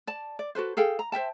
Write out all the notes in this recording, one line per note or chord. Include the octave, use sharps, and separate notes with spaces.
D5 A5
D5
F#4 A4 B4 C5
G#4 A4 F5 G5
A#5
C5 E5 G5 A5